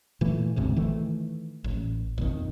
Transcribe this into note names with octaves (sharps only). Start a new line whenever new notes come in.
A#2 E3 A3
A1 D2 G#2 C3
D#3 E3 A3
A1
A#1 F2 D#3